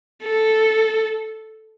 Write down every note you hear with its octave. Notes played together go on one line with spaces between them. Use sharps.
A4